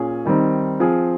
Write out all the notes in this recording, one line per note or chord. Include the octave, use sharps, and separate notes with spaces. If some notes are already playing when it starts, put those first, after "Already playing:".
Already playing: A#2 C#4 G#4
D#3 G3 C4 D#4
F3 C4 F4 G#4